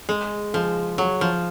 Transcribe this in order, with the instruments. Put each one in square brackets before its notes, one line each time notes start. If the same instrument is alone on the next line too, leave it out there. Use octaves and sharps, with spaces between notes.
[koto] G#3 [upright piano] G#4
[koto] F3 [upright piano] G#4
[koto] F#3 [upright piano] G#4
[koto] F3